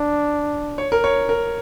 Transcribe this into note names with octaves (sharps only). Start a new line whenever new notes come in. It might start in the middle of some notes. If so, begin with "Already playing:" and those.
Already playing: D4
C#5
A#4
C#5
A#4